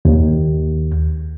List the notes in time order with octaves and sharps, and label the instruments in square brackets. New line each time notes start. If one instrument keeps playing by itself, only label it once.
[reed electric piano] D#2